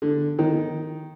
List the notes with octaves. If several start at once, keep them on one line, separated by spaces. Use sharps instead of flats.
D3
D#3